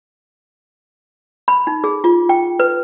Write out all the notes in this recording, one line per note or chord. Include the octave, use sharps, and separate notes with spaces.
B5
D#4
G#4
F4
G5
B4